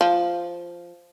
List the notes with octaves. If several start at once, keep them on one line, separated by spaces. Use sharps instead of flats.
F3